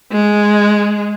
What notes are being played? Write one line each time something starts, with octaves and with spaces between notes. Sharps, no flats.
G#3